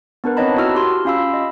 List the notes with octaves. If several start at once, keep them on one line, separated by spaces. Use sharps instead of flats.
B3 D4 A#4 B4
C4 D#4 C#5 D#5 A5 B5
E4 F#4 E6 F6
G4 C6
C#4 F4 F5 B5 E6
D#5